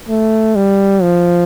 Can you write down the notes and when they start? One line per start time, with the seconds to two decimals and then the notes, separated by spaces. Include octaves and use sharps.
0.09 A3
0.55 G3
1.02 F3